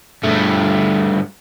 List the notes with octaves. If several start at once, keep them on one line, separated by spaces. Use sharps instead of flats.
G2 A3